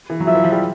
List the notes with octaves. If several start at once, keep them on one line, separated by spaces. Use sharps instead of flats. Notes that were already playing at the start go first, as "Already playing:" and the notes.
E3
F#3
F3 E5
E3
F3
G3